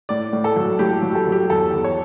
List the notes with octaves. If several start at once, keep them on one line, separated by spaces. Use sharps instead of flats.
A2 D5
A2
A4
F#3
A2 G4
F#3
A4
F#3
G4
E2 A4
E2
C#5